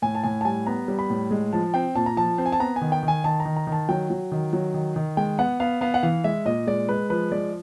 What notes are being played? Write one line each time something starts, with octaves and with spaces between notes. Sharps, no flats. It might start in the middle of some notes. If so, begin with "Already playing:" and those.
A2 G#5
A5
A2 G#5
A5
G3 G#5
B3 A#5
G3
B5
A2
G#3
F3 A5
C4 G5
A#2 A5
A#5
F3 A5
C4
G#5
A5
B3 A#5
G#5
D#3
G5
D#3
G#5
D#3 A5
A#5
D#3
A#5
D#3
A5
F#3 G5
F#3
D#3
F#3
D#3
D#3
G#3 G5
B3 F#5
B3 F5
B3 F5
F#5
E3 F5
G#3 E5
A#2 D#5
G#3 D5
G#3 B4
F3 B4
G#3 D5